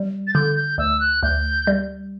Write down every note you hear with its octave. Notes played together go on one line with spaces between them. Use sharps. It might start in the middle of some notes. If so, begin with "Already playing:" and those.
Already playing: G3
A6
D3 G6
G6
D2 E6
F#6
D2 G6
G3